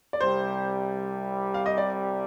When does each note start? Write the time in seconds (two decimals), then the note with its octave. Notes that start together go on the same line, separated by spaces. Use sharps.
0.13 D5
0.21 C2 C3 G3 C5
1.54 F5
1.66 D#5
1.78 D5